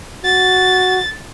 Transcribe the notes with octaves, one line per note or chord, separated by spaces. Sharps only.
F#4 A6